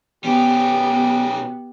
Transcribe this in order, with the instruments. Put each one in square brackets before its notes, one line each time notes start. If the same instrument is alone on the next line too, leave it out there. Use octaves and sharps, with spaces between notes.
[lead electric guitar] B2 C#4 [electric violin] B3 [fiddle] G4